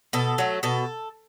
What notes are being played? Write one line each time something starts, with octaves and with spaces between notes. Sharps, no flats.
B2 A4
F#3 A3
B2 A4